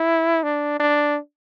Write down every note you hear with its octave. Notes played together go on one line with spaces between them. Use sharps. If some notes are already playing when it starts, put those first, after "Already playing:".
Already playing: E4
D4
D4